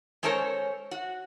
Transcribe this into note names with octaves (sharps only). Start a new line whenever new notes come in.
G#3 C#4 A4 A#4 C5 C#5
F#4